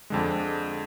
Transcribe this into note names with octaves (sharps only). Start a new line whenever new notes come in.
F2 D3 G#3